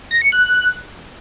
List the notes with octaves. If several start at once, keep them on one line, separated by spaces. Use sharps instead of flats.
A#6
C#7
F#6